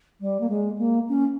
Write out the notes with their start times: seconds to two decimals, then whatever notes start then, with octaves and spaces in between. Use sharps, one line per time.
0.21 G3
0.40 A#3
0.49 G#3
0.78 A#3
1.09 C#4